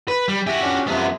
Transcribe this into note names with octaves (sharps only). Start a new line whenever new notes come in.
B4
G3
F#4 G4 E5 G#5
C#4 D4
F#2 C3 F3 G#3 B3